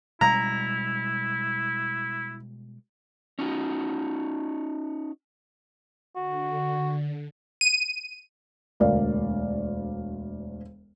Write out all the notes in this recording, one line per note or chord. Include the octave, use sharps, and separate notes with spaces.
B2 G3 G#3 E4 A#5
C#4 D#4 F#4
D3 F#4
D#7
E1 D2 A#4 D5 F5